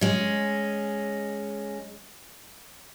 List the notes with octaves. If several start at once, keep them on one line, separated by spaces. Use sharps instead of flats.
G#3 C#4